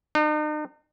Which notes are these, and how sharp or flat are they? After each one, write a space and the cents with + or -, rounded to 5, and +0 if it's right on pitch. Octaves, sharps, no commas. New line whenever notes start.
D#4 -45